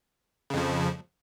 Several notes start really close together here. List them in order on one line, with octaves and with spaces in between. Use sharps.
C#3 F2 F3